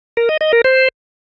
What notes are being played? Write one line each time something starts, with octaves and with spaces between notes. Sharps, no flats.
A#4
D#5
D#5
A#4
C5